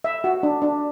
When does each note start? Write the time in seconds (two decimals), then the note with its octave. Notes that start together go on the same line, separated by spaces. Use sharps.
0.04 E5
0.24 F#4
0.43 D4
0.62 D4